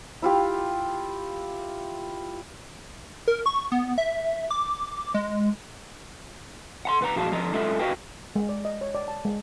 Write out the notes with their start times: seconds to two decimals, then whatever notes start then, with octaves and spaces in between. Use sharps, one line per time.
0.22 E4 F4 G4
3.28 A#4
3.46 C#6
3.72 B3
3.98 E5
4.51 D6
5.14 G#3
6.85 F#5 A#5 C6
7.01 C#2 B4 F#5 A#5
7.16 A#2 F3 F#4 G#4 F5 A5
7.32 F2 D3 F3 D4 D#5 A#5
7.53 F#2 G#3 F4 A4 E5 F#5
7.79 F#4 A#4 B4 D#5 F5 G5
8.36 G#3
8.49 D5
8.65 D#5
8.81 C#5
8.95 D5
9.08 A5
9.25 G#3